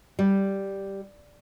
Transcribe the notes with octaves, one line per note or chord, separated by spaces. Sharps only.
G3